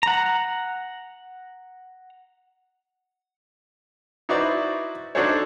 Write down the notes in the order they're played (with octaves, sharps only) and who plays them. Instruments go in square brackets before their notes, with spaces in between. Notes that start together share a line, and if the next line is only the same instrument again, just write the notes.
[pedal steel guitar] F#5 A#5
[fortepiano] D#4 E4 F#4 B4 C5 D5
D4 D#4 F#4 A4 C5 C#5